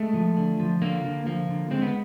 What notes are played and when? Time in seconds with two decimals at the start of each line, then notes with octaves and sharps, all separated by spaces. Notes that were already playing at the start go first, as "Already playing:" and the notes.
Already playing: G#3 A3
0.14 F3
0.37 D3
0.60 F3
0.82 D3 A#3
1.05 D3
1.26 F3 A#3
1.48 D3
1.70 G#3 C4
1.82 B3